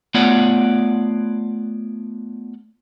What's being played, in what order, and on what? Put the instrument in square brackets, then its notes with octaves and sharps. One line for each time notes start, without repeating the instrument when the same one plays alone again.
[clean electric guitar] A3 B3 F4 C#5 D5 F#5